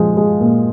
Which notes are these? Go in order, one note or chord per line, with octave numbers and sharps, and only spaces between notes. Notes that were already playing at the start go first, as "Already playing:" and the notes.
Already playing: F3 G#3
G#3
A#2